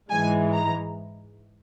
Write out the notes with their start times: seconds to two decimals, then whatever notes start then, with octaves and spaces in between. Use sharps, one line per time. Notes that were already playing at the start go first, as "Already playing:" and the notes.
0.10 G#2 E3 G#3 G#5
0.53 A#5